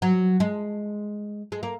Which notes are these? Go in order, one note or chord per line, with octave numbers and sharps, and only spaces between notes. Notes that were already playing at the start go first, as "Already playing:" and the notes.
F#3
G#3
G#3
A#3